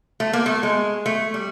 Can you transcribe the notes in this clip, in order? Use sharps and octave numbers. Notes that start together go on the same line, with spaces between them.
A3
A#3
A3
G#3
A3
G3